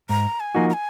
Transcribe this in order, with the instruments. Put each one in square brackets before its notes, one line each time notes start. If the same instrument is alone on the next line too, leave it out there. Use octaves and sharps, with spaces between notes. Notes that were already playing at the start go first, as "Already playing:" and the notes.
[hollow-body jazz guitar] G#2 [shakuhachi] A#5
[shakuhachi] G#5
[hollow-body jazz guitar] F3 A#3 D#4 F#4
[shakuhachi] A#5
G#5